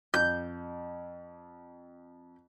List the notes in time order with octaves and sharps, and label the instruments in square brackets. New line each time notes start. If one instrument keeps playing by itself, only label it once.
[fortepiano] F2 [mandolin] G6